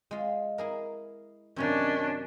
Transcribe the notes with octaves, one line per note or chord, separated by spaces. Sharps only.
G#3 F4
E4 G#4 A#4
F#2 C3 D#3 C#4 D4